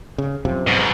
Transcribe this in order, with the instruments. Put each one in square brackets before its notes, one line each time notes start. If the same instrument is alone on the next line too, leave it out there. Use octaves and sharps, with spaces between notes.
[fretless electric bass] C#3
F#2 C3 F3
[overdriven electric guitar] G#2 B2